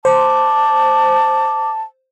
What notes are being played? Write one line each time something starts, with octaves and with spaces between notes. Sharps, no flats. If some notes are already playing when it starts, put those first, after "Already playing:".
C5 A5 D6